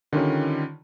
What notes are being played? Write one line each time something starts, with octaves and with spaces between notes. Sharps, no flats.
D3 D#3 G3 C#4 F4